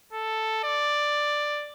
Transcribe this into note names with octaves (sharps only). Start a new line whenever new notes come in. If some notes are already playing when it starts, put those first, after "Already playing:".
A4
D5